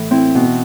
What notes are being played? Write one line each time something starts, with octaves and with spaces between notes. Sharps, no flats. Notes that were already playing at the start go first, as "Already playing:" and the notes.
Already playing: A2 E3
C4 E4
B2